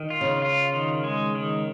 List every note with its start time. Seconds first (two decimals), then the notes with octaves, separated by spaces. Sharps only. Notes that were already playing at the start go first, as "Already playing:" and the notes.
Already playing: D#3
0.10 F4
0.21 C#3
0.42 F4
0.73 D#3
1.04 G#3
1.35 D#3